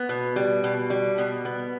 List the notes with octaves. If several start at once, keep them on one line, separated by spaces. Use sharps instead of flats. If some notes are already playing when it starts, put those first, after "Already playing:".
Already playing: B3
B2
G3
B2
G3
B2
B3